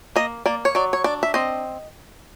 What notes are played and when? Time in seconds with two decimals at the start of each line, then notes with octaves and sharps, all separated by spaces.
0.16 A#3 D#5
0.46 A#3 D5
0.65 C#5
0.75 F#3 D5
0.93 C#5
1.04 D4 D5
1.23 E5
1.34 C4 D#5